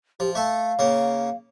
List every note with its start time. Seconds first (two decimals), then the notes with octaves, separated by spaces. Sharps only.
0.20 F3 G4
0.35 A3 A4 F5
0.79 C#3 A#3